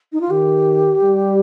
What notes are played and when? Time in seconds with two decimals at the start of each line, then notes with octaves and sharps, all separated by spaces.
0.13 D#4
0.21 F4
0.30 D#3 G4
1.01 G3